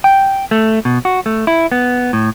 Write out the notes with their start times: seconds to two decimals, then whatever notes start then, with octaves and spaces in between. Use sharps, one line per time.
0.04 G5
0.51 A3
0.85 B2
1.05 F#4
1.26 A3
1.47 E4
1.72 B3
2.13 A2